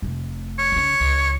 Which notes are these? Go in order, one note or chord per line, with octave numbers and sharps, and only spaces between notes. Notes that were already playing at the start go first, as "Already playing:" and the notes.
F1 A3
C#5
D#2 C#3
C#2